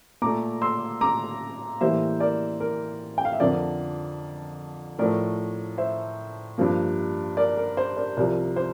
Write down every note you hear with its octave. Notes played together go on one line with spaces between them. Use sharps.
A#2 A3 A#5 D6
C6 E6
A#5 D6
A2 E3 G3 A#3 C5 E5
A#4 D5
A#4
G5
F5
E5
F2 D3 F3 A#4 D5
A2 F3 A3 A#4 D5
C5 E5
G2 F3 A#3
A#4 D5
A#4
C5
A#4 D5
C2 C3 F3 A#4 D5
C5